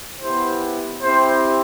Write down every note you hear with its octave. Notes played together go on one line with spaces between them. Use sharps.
B3 E4 G4 C5
C4 E4 G4 C5